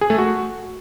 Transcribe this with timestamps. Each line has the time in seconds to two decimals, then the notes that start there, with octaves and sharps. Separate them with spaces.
0.01 G#4
0.10 A3
0.18 F#4